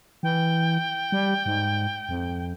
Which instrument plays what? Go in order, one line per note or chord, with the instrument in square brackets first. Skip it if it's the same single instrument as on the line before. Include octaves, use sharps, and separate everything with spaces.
[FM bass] E3 [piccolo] G5
[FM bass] G3
G#2
F2